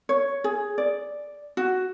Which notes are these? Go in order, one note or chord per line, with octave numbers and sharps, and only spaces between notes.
C#5
G#4
D5
F#4